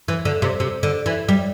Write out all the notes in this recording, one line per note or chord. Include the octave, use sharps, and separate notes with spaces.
E3
D3
C3
C3
D3
E3
G3